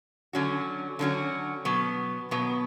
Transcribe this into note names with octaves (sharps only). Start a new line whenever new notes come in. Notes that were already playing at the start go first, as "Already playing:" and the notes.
D3 F#3 C#4 F#4
D3 F#3 C#4 F#4
B2 F#3 B3
B2 F#3 B3